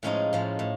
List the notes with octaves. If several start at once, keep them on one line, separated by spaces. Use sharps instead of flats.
A2 F3 G#3 C#4 D#4
A2 F3 G#3
A2